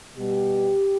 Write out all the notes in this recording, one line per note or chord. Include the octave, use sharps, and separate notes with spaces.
B2 G3 G4